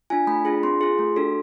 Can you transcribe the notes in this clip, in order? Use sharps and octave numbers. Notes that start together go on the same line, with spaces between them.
D4 F4 G#5
A3 B5
D4 F4 G#4
C4 C6
F4 G#4
A3
D4 F#4 A4